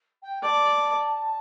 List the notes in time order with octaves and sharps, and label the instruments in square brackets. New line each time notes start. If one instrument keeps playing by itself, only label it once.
[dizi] G5
[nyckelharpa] D5 [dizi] A5